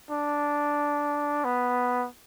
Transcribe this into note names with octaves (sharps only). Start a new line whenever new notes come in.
D4
B3